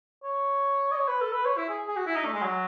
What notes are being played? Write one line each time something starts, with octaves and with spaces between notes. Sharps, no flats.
C#5
D#5
C#5
B4
A4
B4
C#5
E4
G#4
G#4
F#4
E4
D#4
A3
G#3
F#3